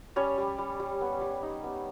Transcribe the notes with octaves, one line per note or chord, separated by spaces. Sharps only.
G3 C#4 C#5
G3
G3
G3
B3
G3
D#4
B3